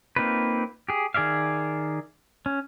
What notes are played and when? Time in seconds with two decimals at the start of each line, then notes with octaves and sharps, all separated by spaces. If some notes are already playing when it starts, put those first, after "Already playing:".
0.16 A#3 C4 D#4 F4 B4
0.89 G4 G#4
1.14 D#3 G#4 D5 E5 F5
2.46 C#4